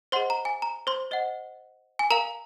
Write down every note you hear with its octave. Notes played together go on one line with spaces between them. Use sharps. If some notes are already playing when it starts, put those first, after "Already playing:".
G#4 C5 D#5 F#5 C6
A#5
G#5
A#5
C5 C6
C5 D#5 F#5
G#5
A#4 F5 A#5